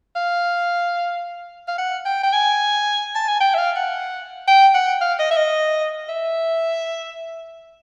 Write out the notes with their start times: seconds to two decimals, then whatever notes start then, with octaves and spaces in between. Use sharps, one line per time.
0.16 F5
1.68 F5
1.78 F#5
2.05 G5
2.24 G5
2.33 G#5
3.16 A5
3.28 G#5
3.40 G5
3.54 E5
3.58 F5
3.76 F#5
4.48 G5
4.75 F#5
5.01 F5
5.19 D#5
5.31 E5
5.37 D#5
6.09 E5